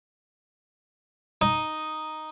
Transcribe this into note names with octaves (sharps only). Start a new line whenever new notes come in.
D#4